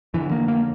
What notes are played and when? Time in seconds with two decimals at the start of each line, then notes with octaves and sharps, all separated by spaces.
0.14 F2 D3 E3
0.31 A#3
0.48 A#3